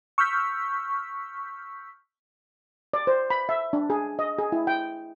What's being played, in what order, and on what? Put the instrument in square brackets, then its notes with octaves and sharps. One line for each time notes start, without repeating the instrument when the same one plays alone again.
[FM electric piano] C#6 E6 F6 G6 B6
[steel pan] D5
C5
B5
E5
D4
G#4
D#5
G#4
E4
G5